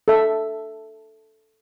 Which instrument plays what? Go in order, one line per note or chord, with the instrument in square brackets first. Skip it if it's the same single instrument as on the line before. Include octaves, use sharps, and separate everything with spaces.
[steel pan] A4 E5